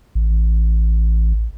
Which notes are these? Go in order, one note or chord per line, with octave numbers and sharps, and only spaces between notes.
A1